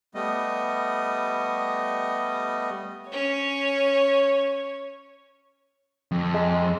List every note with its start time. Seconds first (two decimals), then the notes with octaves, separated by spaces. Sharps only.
0.15 G3 A3 B3 D#5
3.12 C#4 C#5
6.12 F2
6.34 G#3